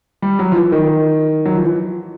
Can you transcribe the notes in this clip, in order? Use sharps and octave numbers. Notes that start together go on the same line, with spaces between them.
G3
F#3
F3
E3
D#3
F#3
F3
E3